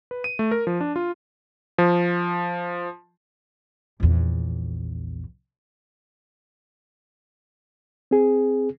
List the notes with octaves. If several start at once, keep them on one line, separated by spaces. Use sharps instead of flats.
B4
D#7
A3
A#4
F3
D4
F4
F3
A#1 E2
C4 G#4